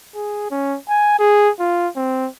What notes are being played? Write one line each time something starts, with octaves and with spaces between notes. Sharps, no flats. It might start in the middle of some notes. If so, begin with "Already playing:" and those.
G#4
C#4
G#5
G#4
F4
C4